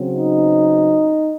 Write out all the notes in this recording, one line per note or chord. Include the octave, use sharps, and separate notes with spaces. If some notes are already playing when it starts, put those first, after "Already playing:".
Already playing: C#3 F#3 C4
D#4